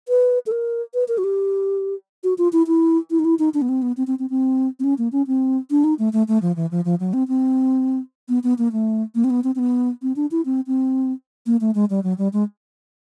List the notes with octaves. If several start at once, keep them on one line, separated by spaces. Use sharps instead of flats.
B4
A4
A#4
B4
A#4
F#4
G4
F#4
F4
E4
E4
E4
D#4
E4
D#4
D4
B3
C4
B3
C4
C4
C4
C4
C4
C#4
A#3
C#4
C4
D4
D#4
A3
A3
A3
F3
E3
F3
F3
F#3
C4
C4
B3
B3
A#3
A3
A#3
C4
B3
C4
C4
B3
C4
D4
E4
C4
C4
A#3
A3
G#3
G3
F#3
G3
G#3